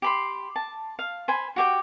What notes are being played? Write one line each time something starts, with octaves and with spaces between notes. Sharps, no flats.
G4 B5 C6
A5
F5
C5 G#5 B5
F#4 G4 G5